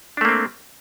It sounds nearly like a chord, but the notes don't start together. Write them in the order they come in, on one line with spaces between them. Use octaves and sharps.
D4 A3 A#3 C4